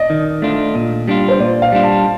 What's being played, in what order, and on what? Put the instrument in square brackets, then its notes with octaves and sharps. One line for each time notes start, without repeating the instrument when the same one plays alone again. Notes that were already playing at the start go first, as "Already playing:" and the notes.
Already playing: [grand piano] D5 D#5
[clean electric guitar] D#3
A3 D4 F4
A#2
G3 D4 F4
[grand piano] C5
[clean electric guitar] A#2 [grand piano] D5
[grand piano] F5
[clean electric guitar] G3 D4 F4
[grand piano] A5